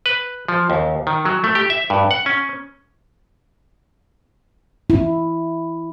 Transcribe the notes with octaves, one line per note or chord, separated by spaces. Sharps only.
B4
F3
D#2
D#3
F#3
A3
G4
E5
G2
F#5
C#4
E4